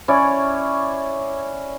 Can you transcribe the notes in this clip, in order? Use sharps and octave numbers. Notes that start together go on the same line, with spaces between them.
C#4 E4 C#5 D5